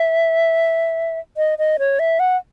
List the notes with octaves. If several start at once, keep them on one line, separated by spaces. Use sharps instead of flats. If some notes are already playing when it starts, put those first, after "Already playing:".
Already playing: E5
D#5
D#5
C#5
E5
F#5